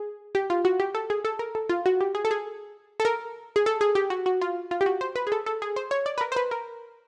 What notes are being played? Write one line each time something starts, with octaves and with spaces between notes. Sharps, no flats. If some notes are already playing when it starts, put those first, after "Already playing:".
Already playing: G#4
G4
F4
F#4
G4
A4
G#4
A4
A#4
A4
F4
F#4
G4
G#4
A4
G#4
A4
A#4
G#4
A4
G#4
G4
F#4
F#4
F4
F4
G4
F#4
C5
B4
G#4
A4
A4
G#4
C5
C#5
D5
B4
A#4
C5
B4
A#4